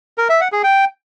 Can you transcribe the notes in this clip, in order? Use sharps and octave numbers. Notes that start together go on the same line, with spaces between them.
A#4
E5
F#5
G#4
G5